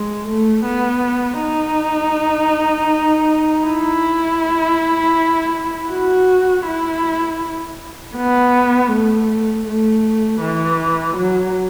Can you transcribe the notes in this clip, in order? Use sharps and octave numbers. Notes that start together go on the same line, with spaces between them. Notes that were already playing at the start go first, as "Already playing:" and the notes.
Already playing: G#3
A3
B3
D#4
E4
F#4
E4
B3
A3
A3
E3
F#3